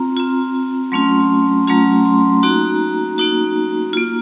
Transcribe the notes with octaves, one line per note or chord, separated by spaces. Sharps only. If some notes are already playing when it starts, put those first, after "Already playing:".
Already playing: C4 F4 A#5
C4 F4
F#3 A3 C#4 F4 C6
F#3 A3 C#4 F4 A#5
C6
A#3 D#4 F#4 A#5
A#3 D#4 F#4
A#3 F4